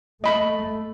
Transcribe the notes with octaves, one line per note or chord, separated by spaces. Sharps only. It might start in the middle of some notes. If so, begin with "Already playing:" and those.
A3 D#5 B5